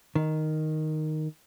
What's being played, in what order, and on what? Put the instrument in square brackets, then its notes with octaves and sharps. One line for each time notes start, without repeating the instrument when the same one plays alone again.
[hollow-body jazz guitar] D#3